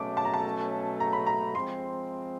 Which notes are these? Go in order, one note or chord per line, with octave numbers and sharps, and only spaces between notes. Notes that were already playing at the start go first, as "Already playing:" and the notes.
Already playing: B2 F#3 A3 C#4 D6
A5
A#5
A5
A#5
B5
A#5
F3 G#3 C4 C6